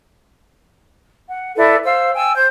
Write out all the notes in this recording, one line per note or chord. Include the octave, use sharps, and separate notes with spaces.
F#5
E4 A4 B4 D5
C5 F5 E6
G5 G#5 E6
C5 G6